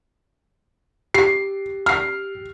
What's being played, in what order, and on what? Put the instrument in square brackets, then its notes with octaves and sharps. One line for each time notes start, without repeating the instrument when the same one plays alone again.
[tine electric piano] G4 [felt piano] C7
[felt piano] F6 C7